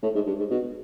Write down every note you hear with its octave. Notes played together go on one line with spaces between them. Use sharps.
A2
G#2
G2
G#2
B2